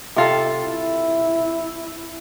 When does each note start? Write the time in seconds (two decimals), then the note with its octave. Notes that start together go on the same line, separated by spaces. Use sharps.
0.16 C3 F4 A4
0.67 E4